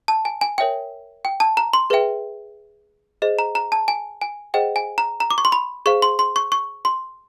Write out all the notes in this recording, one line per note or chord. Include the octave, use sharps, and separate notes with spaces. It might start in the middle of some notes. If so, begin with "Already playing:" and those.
A5
G#5
G#5
A#4 C#5 E5 G5
G5
A5
A#5
C6
G#4 B4 E5 G5
G#4 C5 D#5
A#5
A#5
A5
G#5
G#5
G#4 C5 D#5 F#5 G5
G#5
A#5
A#5
D6
C#6
C6
B5
G#4 C5 F5 C#6
C6
C6
C#6
C#6
C6